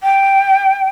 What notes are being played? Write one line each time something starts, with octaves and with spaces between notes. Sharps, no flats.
G5